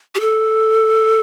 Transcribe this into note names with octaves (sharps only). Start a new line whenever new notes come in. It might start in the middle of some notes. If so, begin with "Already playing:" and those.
G4
A4